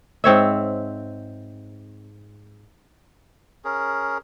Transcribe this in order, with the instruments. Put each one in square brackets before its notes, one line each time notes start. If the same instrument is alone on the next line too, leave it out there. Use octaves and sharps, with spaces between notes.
[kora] G#2 C4 C#5 E5
[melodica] C#4 G#4 A#4